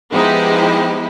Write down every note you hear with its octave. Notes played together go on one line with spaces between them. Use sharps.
F3 G#3 B3 D#4 E4 G4